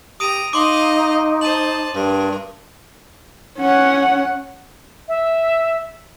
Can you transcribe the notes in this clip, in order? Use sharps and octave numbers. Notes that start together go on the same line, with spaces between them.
G4 A#5 D#6 D7 D#7
D#4 D#5 F5 C6 D6
C5 A5 D#7 F#7
G2 A#4
C#4 F#5
E5